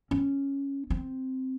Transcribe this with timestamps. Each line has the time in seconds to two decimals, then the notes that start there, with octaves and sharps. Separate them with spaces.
0.11 C#4
0.90 C4